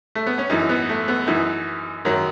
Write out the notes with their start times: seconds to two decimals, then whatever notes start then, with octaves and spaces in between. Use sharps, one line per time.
0.15 A3
0.27 B3
0.38 C#4
0.50 F#2 E3 D#4
0.69 B3
0.89 A3
1.08 B3
1.27 F#2 E3 D#4
2.05 F#2 D#3 F#3